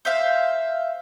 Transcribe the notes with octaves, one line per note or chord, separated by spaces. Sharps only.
C5 E5 F5